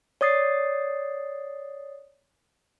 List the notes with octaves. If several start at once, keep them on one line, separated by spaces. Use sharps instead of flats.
C#5 D5 D#6 A6 C7